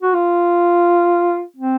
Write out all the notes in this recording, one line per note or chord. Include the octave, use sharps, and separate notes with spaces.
F#4
F4
C4